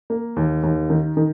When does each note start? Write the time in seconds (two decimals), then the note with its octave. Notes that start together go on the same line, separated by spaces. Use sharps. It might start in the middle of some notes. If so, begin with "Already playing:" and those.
0.10 A#3
0.36 D#2
0.63 D#2
0.90 D#3
1.17 D#3